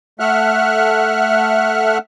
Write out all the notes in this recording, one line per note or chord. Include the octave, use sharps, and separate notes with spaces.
A3 E5 F#5 F6 F#6